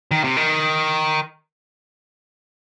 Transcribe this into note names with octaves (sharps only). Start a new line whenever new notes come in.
D#3
C3
D#3